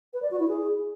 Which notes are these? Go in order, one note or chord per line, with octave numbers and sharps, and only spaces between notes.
B4
D5
F#4
E4
G#4